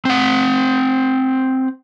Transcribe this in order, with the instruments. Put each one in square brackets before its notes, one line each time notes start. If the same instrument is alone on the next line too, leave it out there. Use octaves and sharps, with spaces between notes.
[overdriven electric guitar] C4 F#5